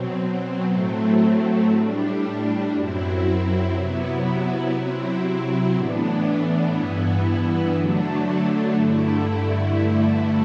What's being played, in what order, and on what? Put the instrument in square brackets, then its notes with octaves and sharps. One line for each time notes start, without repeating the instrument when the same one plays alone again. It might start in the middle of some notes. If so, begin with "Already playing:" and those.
Already playing: [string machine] B2 F#3 C4
A2 F#3 A3 C4
A2 G3 D4
F#2 F#3 C4 E4
C3 F#3 B3 E4
C3 F#3 C4 E4
A2 E3 B3 D4
G2 E3 B3 E4
D3 F#3 A3 D4
G2 D3 A3 E4
G2 D3 A3 E4